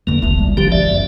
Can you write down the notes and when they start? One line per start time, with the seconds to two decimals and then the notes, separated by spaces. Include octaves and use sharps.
0.07 E2 D3 A#3
0.22 D1 A1 F4
0.39 G3
0.57 D3 F3 C#4 G4
0.72 G#1 D3 D5 E5
0.91 F#2 D#3